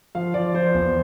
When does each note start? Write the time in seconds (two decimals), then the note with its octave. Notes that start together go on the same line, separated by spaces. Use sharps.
0.15 F3 F5
0.34 F3 D5
0.54 F3 C5
0.74 E2